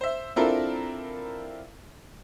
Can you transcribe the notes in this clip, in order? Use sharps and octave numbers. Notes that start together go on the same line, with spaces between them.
C5 E5
C4 D4 E4 F4 A4 A#4